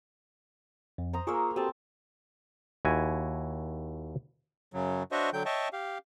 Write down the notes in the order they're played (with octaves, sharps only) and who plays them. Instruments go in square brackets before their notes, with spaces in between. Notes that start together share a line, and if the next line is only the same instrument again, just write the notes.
[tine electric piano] F2
[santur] C5 A#5 D#6
[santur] A#3 G#4 [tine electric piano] F4 C#6 E6
[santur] C4 A5 [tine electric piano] F#4 G4 A4
[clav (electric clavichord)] D#2 E4 F#4 G#5
[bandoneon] F#2 C#3 F#3
D4 F#4 C5 C#5 D#5 E5
D3 F#3 G5 G6
C#5 D#5 E5 G5 A5
G4 F5